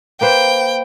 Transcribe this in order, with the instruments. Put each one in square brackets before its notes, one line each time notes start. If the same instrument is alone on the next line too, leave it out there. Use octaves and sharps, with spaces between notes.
[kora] A#3 B4 C5 [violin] G5